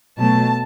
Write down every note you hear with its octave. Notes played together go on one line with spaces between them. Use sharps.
B2 F#3 A3 A5